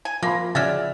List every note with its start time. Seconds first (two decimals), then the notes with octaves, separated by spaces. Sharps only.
0.05 G#5
0.23 F3 A#3 B5 C6 A#6
0.55 C#3 F#4 D5 E5 G#5 F6 A6